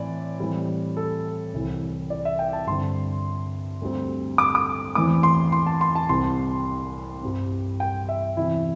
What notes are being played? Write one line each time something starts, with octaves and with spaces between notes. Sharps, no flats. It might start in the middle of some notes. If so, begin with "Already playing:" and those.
Already playing: A2 E3 C4 D5
A2 E3 G3 C4
A4
C2 C3 E3
D5
E5
G5
A5
G2 D3 C4 C6
D2 D3 G3 C4
D6
D6
E2 E3 A3 C4 D6
C6
C6
A5
C6
A5
C2 C3 G3 C4 C6
G2 G3 C4
G5
E5
E2 C3 E3 E4